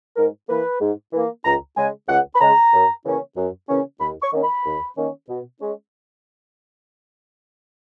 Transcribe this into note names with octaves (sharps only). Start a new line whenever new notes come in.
G#2 A#4
E3 A#3 B4
G#2
E3 A#3
C#2 A#5
C#3 G#3 G#5
C#2 F#5
B5
C#3 G#3 A#5
F#2
C#3 E3 A#3 C#4
F#2
C#3 E3 A#3 C#4
D#2 B5
C#6
D#3 A#3 C#4
B5
D#2
D#3 A#3 C#4
B2
G#3 C#4